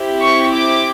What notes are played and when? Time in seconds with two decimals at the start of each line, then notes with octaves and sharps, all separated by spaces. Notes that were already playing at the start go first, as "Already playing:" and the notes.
Already playing: C4 E4 G4
0.22 C#6
0.54 D6